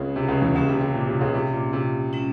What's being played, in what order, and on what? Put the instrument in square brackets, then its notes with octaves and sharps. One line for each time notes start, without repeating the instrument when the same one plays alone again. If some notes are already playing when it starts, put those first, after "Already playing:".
Already playing: [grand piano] C#2 C#3 [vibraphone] C4 F4 G#4 E5
[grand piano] C3
C#2 C#3
E2 E3
[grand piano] C#2 C#3 [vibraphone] A#3 C#4 G4
[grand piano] C3
C3
A#2
C3
C#2 C#3
C3
A#2
C3
[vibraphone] G#3 C#4 E4